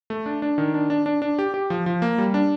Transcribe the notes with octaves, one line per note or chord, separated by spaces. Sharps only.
A3
D4
D4
D#3
D4
D4
D4
D4
G4
G4
F3
F3
A#3
G3
D4